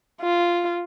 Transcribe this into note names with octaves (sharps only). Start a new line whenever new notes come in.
F4